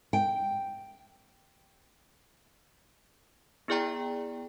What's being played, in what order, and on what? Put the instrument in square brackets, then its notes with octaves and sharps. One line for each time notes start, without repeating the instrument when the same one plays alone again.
[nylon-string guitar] G5
[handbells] B3 E4 G#4 D5 G5 A#5